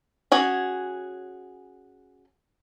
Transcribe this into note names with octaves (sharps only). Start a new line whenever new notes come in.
C#4 F#4 G#4 C#5